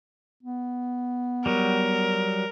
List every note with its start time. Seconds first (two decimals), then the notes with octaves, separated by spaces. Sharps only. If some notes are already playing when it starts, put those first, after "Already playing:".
0.43 B3
1.46 F#3 G3 A#4